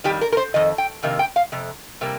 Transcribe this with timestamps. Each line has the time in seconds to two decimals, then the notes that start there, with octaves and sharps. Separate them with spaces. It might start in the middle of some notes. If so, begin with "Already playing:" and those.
0.04 F2 D#3 G3 G4
0.21 A#4
0.32 A#4
0.37 C5
0.54 F2 D#3 D#5
0.78 G5
1.03 F2 C3 D#3 A#3
1.19 G5
1.36 F5
1.52 F2 C3
2.01 C3 G3 A#3